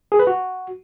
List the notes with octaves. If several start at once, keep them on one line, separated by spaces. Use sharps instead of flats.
G#4
B4
F#4